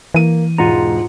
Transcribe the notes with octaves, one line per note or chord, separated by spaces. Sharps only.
E3 A#3 D#7
E1 G#2 F4 F#5 A#5